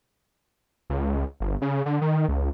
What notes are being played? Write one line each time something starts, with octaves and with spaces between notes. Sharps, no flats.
C#2
G1
C#3
D3
D#3
C#2